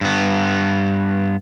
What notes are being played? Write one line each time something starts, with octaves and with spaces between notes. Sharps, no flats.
G2 B3